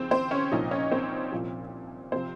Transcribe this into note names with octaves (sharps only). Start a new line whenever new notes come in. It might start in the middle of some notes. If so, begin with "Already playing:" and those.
Already playing: D#2 C#3 F3 C4 C5
C4 C5
C#4 C#5
C2 A#2 F3 D#4 D#5
C#4 C#5
C4 C5
C2 A#2 F3
C3 F3 C4 C5